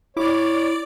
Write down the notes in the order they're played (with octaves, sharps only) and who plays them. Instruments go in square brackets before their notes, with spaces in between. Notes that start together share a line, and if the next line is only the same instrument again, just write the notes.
[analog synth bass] E4 [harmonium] C#5 [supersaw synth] D5 D6